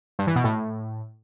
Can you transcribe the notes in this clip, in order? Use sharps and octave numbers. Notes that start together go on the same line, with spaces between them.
G2
E3
B2
A2